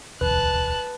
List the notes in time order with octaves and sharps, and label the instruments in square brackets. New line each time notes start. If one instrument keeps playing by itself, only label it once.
[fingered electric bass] D1 B1 E2 [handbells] B4 [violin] A5 F#6